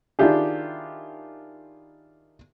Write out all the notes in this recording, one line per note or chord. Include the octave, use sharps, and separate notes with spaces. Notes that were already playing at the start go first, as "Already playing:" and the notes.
D#3 D4 E4 F4 G4 G#4